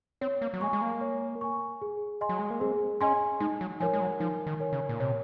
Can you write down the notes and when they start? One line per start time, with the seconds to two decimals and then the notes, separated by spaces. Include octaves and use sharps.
0.21 C4 C#5
0.42 A#3
0.54 F#3
0.61 G#3 G#5 C#6
0.73 G#3
0.81 A#3
1.01 C#5
1.41 G#5 C#6
1.82 G#4
2.21 D#5 G#5 C6
2.29 F#3
2.39 G#3
2.50 A#3
2.60 C4 G#4
3.01 C#4 D#5 G#5 C6
3.40 G#3 D#4
3.61 F#3
3.80 F3 A#4 C#5 G#5
3.93 G#3
4.01 F#3
4.20 F3 D#4
4.47 D#3
4.60 A#4 C#5 G#5
4.73 C#3
4.89 A#2
5.00 C3 C#5